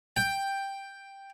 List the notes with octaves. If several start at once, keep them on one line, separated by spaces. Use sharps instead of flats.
G5